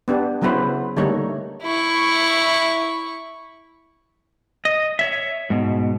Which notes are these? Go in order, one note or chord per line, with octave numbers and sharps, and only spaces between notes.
B3 D4 G4
C#3 F#3 B3 E4 B4 C5
D3 G3 A3 A#3 D#4 C#5
E4 C#6
D#5
C#5 E5
G#2 B2